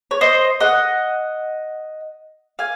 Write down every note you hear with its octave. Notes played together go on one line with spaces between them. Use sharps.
C#5
C5 D#5
D#5 F#5
F5 G#5